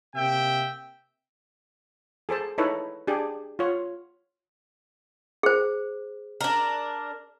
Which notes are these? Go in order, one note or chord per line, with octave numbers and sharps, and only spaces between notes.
C3 A#3 E5 G5
G#4 A4 C5 A5
D#4 E4 A4 B4 C#5
D4 G4 G#4
F4 C#5
G#4 C5
D4 A#4